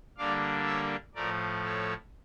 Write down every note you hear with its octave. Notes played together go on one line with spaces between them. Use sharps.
D3 G3 A#3 D4 D5 F5
C#5 E5
A2 F3 A3 A#4 D5
A4 C#5